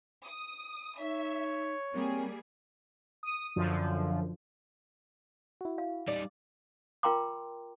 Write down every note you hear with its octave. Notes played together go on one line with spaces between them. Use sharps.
D#6
D#4 C#5 E5
G3 A#3 C4 G#4
D#6 D#7
F#2 D3 F3
E4 F#4
F5
G3 D#4 D5
F4 A#4 G5 A#5 C6 D6